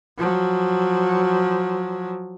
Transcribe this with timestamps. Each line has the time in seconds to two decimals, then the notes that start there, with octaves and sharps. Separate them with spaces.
0.18 F3 F#3